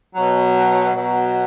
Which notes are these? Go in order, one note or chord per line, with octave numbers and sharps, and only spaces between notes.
B2 F#3
B2 F#3